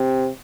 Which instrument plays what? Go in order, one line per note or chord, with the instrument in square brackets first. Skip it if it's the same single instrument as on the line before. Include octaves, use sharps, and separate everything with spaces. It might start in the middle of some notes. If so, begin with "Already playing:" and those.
Already playing: [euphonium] C3